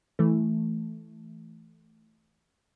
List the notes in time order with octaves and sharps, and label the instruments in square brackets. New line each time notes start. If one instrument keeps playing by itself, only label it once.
[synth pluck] E3 A3